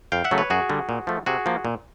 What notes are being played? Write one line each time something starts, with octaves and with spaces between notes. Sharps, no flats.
F2 F5 G5
E5 F#5
C#3 F#3 A3
B4 C#5
F#2 F#4 G#4
D3 G3
A#2
F3 A3
C3 F#4 G#4
F3 A#3
A#2